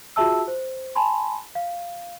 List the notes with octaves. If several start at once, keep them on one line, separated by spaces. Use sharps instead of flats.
F4 F#4 G#4 E5 A5 E6
C5
G#5 A5 B5 C6
F5